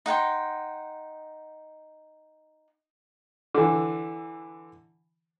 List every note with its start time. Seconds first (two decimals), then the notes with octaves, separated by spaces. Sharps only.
0.06 D#4 F#5 G5 C6
3.54 D3 E3